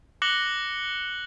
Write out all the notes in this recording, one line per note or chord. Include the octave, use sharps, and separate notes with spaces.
D6 F#6 A#6 C#7 F#7 G7